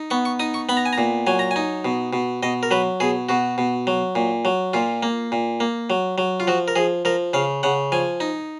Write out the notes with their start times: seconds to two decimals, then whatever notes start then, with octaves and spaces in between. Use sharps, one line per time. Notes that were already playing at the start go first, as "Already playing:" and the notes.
Already playing: D#4
0.10 B3 C#6
0.25 C#6
0.39 D#4 D#6
0.54 C#6
0.69 B3 B5
0.77 A#5
0.86 G#5
0.93 A#5
0.98 A#2
1.27 F#3 G#5
1.39 A#5
1.51 G#5
1.56 D#4
1.85 B2
2.13 B2
2.43 B2 D#5
2.63 A#4
2.71 F#3 B4
3.00 B2 G#4
3.29 B2 F#4
3.58 B2
3.87 F#3
4.15 A#2
4.45 F#3
4.73 A#2 F4
5.03 A#3
5.32 A#2
5.60 A#3
5.90 F#3
6.18 F#3
6.40 F4
6.47 F3 F#4
6.68 A#4
6.76 F3 G#4
7.05 F3 A#4
7.33 C#3 F5
7.63 C#3 F#5
7.92 F3 G#5
8.20 D#4